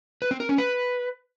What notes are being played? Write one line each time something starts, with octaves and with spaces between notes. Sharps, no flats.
B4
C4
A#4
C#4
B4